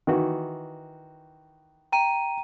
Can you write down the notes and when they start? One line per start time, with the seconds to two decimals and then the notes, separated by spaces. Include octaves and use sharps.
0.07 D#3 E3 F#4
1.92 G5 A#5 D#7